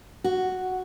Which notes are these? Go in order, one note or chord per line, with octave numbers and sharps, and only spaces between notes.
F#4